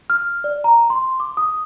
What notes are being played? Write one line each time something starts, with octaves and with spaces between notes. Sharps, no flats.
F6
D5
A#5
C6
D6
D#6